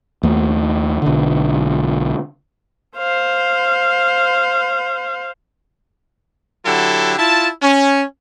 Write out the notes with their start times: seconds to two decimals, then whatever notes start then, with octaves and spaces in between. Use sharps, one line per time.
0.23 D#2 A3
1.02 B1 D3
2.97 C5 F5
6.66 D3 F#3 E4 G4 A4
7.18 E4 F4 A5
7.62 C#4